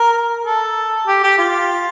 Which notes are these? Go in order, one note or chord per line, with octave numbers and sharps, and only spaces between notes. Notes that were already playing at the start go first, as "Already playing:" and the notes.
Already playing: A#4
A4
G4
G4
F4